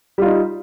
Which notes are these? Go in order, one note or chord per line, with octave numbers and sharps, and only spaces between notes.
G3 D#4 F4